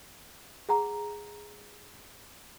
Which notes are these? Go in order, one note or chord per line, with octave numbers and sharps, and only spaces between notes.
G#4 F#5 A#5